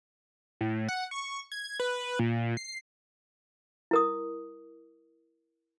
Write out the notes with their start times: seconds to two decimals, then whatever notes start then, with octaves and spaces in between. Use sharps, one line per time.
0.61 A2
0.89 F#5
1.11 C#6
1.52 G#6
1.80 B4
2.19 A#2
2.57 C7
3.91 E4 A#4 D#6